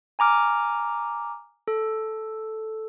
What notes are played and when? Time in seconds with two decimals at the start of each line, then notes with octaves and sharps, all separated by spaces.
0.19 G#5 A#5 D6 F6
1.68 A4